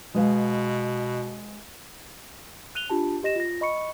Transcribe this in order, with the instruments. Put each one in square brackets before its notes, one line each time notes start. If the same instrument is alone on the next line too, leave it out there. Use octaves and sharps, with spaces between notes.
[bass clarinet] B2 [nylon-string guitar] G#3 B4 F5
[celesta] F#6 D#7 F7 G7
D4 F4 G4 A5
G4 D#5 A#6 E7
F4 A#6
D#5 B5 C#6 C#7